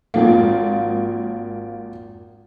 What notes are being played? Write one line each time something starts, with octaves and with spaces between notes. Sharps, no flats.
G#1 F3 A#3